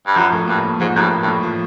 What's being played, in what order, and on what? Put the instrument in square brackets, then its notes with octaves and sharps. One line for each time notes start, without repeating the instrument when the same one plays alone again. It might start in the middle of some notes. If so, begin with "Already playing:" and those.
[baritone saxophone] G2
[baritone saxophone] F#2 [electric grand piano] F3
[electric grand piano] A2
[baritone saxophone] G2 [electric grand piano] A#3
[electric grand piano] A2
[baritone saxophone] G#2 [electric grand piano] F3
[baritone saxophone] F#2 [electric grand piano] A2
[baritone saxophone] G2
[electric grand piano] A#3
[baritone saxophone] G2
[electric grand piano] A2
F3